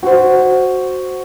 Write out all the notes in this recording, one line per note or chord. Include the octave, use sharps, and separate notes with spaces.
F#4 C5